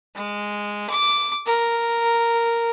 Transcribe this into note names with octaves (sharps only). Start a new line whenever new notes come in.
G#3
D6
A#4